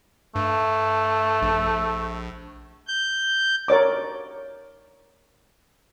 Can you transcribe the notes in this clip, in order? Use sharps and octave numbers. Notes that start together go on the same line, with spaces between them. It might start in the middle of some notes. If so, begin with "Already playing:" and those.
G2 A3
A#1
G6
A#4 C#5 D5 D6